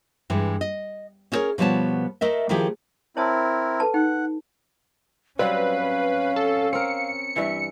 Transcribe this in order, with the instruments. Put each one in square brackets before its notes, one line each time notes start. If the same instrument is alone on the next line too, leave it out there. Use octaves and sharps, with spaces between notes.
[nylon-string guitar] G2 E3 G#3
D#5
C#4 E4 G#4 A#4 C#5
B2 F3 G3 B3 C#5 A5
A3 A#4 D#5 E5
D#3 F3 A3 E4 G4 G#4
[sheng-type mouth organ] C4 E4 A#4 [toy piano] C#5 A5 D#6
[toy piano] A4 B4 A5
[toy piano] D#4 G5 [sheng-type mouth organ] F#5
[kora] F#3 G3 C4 [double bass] C#4 [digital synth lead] B4 [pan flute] F5
[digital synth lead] A4
[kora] C4 A#4 [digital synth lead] C#7
[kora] G2 E3 [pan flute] E5